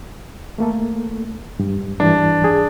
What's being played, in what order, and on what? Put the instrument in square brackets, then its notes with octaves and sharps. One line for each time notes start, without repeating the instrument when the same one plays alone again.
[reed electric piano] A3 A#3 A4
G2
[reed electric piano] G2 E3 [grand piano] D4
[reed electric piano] G#4